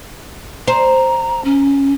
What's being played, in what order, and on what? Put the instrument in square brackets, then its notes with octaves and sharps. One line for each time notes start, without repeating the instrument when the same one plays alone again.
[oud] C5 [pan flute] A#5
[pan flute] C#4